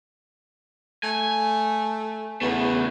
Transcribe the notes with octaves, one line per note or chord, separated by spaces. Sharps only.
A3 G#5
E2 C#3 A3 B3